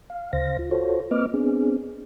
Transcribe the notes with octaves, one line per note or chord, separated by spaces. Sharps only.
F5
D2 C#3 C5 F5 A#6
F4
F4 F#4 A4 C5 C#5
A#3 C4 B4 D#5 D6 F6
B3 C4 D4 G#4